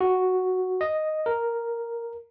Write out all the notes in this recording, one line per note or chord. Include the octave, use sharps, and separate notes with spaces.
F#4
D#5
A#4